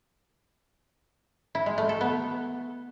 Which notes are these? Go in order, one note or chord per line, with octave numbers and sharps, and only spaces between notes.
E4
G#3
A3
A4
B3